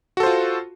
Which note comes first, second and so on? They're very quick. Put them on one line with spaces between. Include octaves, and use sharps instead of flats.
F#4 A4 C5 F4